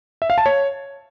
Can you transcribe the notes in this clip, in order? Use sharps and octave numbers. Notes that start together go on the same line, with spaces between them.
E5
F5
A5
C#5